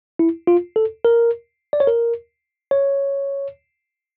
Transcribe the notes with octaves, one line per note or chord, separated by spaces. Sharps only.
E4
F4
A4
A#4
D5
C#5
A#4
C#5